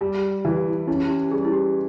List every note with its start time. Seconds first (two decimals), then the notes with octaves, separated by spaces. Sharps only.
0.01 G3 G4
0.45 E3 E4
0.57 G4
0.68 E4
0.87 C#4 E4
1.05 E4
1.09 G4
1.31 G3 G#4
1.45 E4
1.53 G4